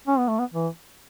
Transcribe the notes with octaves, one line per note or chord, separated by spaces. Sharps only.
C#4
B3
A3
B3
E3